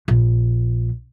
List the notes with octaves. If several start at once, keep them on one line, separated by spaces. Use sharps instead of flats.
A#1